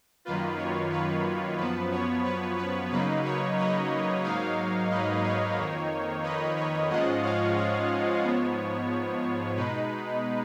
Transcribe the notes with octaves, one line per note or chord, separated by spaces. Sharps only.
F#2 D#3 A#3 F4 B4
C#5
B4
F#2 F3 B3 B4
C#5
B4
B4
C#3 F#3 A#3 D#4 B4
C#5
B4 D#5
G#2 F#3 A#3 D#4 C#5 F5
B4 D#5
C#5
F2 D#3 A#3 D#4
B4 D#5
C#5
G#2 F3 G#3 C#4 F4 D#5 F#5
C#5 F5
C#5
G#2 F3 B3
B2 G#3 D#4 B4